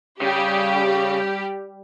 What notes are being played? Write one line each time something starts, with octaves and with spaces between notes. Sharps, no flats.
C#3 G3 G4